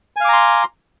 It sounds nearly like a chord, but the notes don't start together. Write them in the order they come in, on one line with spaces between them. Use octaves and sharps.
G#5 F5 D6 A#5 C6